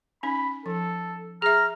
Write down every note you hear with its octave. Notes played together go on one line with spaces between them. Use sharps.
C#4 D#4 B5
F3 A4
G#4 E5 A#5 F6